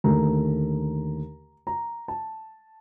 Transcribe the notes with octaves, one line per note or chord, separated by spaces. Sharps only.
D#2 D3 A3 A#5
A#5
A5